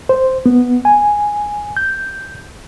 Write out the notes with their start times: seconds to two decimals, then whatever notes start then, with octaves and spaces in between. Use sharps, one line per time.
0.09 C5
0.46 B3
0.85 G#5
1.77 G6